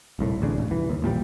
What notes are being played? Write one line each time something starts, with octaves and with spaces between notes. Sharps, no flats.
D#1 C2 A2
D1 A1 C#3 D4
D#1 G#1
C2 E3
D#2
A1 A#2 F3 G3